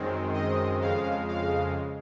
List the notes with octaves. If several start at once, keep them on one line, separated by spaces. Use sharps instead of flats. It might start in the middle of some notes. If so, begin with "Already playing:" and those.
Already playing: F#2 D#3 G#3 C4
D#5
F2 C#3 G#3 F5
F5